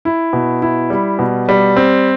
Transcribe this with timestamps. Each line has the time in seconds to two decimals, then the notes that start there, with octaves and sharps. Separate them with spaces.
0.05 E4
0.33 B2
0.62 E4
0.90 G3
1.19 B2
1.49 G3
1.76 C4